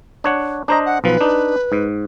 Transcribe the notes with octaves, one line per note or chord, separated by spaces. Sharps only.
D4 C#5 F#5
D4 C5 D#5 A#5
F#5
B1 F3 B4
D4 D#4
G#2